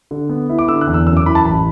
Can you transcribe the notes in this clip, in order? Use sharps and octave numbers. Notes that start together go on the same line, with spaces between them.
D3
B3
E4
D6
D3 E6
F#6
E2
E6
F#2 E6
D6
E3 B5
A5
A1 B5